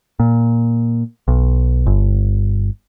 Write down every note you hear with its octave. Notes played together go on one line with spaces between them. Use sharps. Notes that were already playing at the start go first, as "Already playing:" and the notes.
A#2
B1
G1